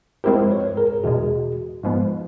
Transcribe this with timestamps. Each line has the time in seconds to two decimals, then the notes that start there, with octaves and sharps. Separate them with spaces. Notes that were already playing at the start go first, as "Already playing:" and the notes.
0.24 F3 G#3 C4 E4 G4 A#4 C5
0.50 B4 C#5
0.77 G#4 A#4
1.04 E2 B2 G#3 F#4 G#4
1.83 G#2 F3 G#3 B3